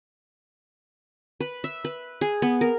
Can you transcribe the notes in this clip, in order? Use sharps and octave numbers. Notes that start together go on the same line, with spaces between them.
B4
E5
B4
G#4
B3
A#4